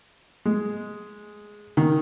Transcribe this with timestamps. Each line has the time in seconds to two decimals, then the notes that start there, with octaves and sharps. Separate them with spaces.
0.45 G#3
1.77 D#3